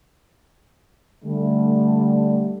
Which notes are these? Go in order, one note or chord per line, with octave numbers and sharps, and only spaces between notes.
D3 G3 A3